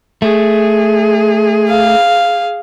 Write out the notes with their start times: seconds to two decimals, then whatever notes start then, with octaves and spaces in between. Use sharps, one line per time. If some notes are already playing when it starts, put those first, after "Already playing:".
0.22 A3 G#4
1.69 F5